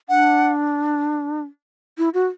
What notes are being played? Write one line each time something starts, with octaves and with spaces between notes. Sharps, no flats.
D4 F#5
E4
F#4